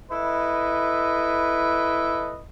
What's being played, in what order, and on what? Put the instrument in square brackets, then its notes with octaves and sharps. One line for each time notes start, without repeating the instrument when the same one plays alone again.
[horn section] E4 A4 B4 D#5